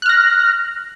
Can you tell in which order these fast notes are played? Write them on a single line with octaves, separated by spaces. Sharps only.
F#6 F6 A#6